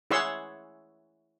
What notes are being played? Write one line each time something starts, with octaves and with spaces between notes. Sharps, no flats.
E4 G#4 C#5 F#5 C6 E6